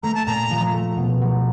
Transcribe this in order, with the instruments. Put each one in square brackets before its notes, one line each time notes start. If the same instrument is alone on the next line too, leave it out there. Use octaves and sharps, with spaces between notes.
[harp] A3 [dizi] A#5
[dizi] A5
[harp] A#2 [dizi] A#5
[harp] F3
A3
B2
F#3